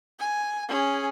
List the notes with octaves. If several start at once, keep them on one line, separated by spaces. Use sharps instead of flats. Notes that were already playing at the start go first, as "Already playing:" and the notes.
G#5
C#4 G#4